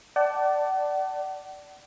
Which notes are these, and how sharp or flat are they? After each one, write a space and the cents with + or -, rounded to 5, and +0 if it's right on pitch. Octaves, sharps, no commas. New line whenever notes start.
D5 +0 F#5 +40 A5 +0